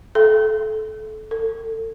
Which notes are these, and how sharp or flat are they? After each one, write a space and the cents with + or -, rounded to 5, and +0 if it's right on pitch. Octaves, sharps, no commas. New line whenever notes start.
A4 -25
A4 +30